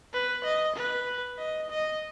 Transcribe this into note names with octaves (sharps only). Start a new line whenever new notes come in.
B4
D#5
B4
D#5
D#5